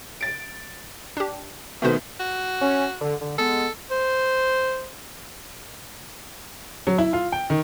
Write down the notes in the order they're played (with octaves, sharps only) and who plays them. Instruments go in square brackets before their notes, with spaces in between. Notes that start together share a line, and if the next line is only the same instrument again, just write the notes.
[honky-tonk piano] A6 D7
[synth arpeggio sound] D4 G4
[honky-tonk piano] B2 D#3 B3 [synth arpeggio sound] A3 C5
[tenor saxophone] F#4
[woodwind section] C#4
D3
D3
[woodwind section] G#3 B3 [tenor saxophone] A4
[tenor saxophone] C5
[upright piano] F#3
E4
F4
G5
D#3